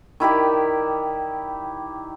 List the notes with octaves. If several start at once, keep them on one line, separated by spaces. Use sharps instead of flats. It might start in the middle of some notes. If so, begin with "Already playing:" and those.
D#3 E4 G4 D5